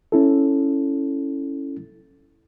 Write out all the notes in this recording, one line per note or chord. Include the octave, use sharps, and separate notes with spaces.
C#4 E4 A4